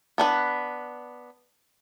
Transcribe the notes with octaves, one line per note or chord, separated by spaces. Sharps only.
B3 D4 B4